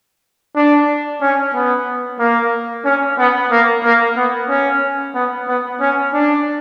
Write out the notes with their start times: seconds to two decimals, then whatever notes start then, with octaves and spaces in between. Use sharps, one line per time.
0.56 D4
1.22 C#4
1.54 B3
2.20 A#3
2.85 C#4
3.18 B3
3.51 A#3
3.84 A#3
4.17 B3
4.49 C#4
5.15 B3
5.48 B3
5.80 C#4
6.14 D4